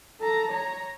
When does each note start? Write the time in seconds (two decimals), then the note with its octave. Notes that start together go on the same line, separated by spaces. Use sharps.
0.20 A4 A#5
0.51 C#5 A#5